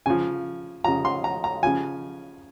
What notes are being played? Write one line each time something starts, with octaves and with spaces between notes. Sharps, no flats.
C#3 F3 G#5
C#3 F3 A#5
C6
A#5
A#5
C#3 F3 G#5